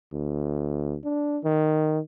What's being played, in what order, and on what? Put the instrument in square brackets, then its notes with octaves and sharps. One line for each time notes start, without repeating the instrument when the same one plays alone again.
[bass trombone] D2
D4
D#3